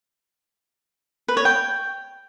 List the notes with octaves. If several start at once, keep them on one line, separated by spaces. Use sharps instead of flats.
B4
C#5
G5